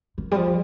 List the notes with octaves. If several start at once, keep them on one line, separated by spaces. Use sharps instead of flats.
D#3
G3
F3